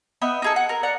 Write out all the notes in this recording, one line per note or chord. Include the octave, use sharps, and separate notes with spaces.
B3 D#5 E5 G5
D#4 G#4 A4
F#5
A#4
D5 F#5 A#5